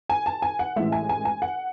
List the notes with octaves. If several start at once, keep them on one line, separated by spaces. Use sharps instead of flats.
G#5
A5
G#5
F#5
A1 A2 E3 G#3 E5
G#5
G#5
G#5
F#5